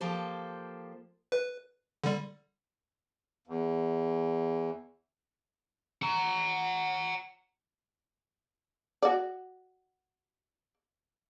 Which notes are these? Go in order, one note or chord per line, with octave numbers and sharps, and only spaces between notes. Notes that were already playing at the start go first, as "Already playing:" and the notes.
F3 A#3 G4 A4 C5
B4
D3 G3
E2
F#5 A#5
F#4 D5